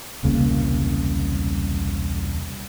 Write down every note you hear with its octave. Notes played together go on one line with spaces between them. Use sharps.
E1 C2 C#3 A#3